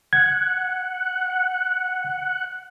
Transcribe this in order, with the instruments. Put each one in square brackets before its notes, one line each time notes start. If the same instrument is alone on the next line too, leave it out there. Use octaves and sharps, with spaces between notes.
[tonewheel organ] F#5 [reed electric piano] G#6